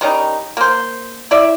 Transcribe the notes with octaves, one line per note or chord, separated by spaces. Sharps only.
D#3 G3 C#4 D#4
A#3 C5
E4 D5 E5